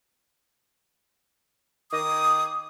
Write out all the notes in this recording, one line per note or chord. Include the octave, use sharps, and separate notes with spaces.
D#3 D6 D#6